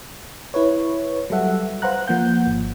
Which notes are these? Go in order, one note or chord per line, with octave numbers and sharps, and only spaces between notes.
E4 B4 C#5
F#3 G3 A4 E5 F#5
B4 C5 F5 F#5 A#5 F#6
F3 A#3 F#5 G6
G#1